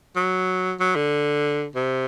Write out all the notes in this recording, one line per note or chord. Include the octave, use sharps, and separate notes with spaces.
F#3
F#3
D3
C3